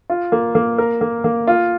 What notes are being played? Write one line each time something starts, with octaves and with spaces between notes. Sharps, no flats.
F4
A#3
A#3
A#4
A#3
A#3
F4